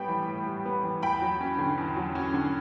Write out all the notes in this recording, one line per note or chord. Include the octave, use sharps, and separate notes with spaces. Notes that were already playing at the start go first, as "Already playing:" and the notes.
Already playing: A2 G3 B3 G5 B5
E3
A2
G3
B3
E3
E2 G5 B5
F#3
C#4
D3
E2
F#3
C#4
D3